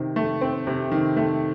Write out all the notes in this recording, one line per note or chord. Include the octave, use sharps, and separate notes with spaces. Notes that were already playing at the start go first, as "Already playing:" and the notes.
Already playing: C3 D#3
A3
C4
C3
D#3
A3